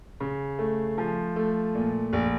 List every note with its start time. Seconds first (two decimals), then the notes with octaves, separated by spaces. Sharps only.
0.20 C#3
0.59 A3
0.98 F3
1.36 A3
1.75 A#2
2.13 A#1